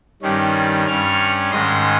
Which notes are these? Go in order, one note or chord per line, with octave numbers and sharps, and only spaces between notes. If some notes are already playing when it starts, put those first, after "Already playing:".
G2 D#3 G3 C#4
G2 G3 C#4 C#6 F6
G#2 D#3 G#3 C#4 C6 D#6